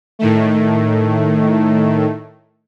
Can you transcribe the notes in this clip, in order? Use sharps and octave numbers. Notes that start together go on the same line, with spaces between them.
A2 D#3 A3